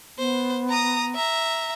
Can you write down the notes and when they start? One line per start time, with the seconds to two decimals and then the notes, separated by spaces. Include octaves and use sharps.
0.18 B3 C5
0.69 A#5 D#6
1.15 E5 A#5